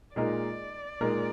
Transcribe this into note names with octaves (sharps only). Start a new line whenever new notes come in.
A#2 G#3 D#4 A#4 D5
A#2 G#3 D#4 A#4